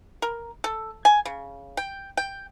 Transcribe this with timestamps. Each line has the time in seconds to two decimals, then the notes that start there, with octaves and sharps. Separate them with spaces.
0.22 A#4
0.64 A4
1.05 G#5
1.25 C#3
1.77 G5
2.17 G5